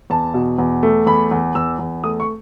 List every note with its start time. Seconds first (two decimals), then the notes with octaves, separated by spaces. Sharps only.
0.10 E2 A5
0.34 B2
0.58 E2
0.83 A3
1.06 E2 B5
1.31 E2
1.55 E2 E6
1.79 E2
2.04 A3 D#6
2.20 C#6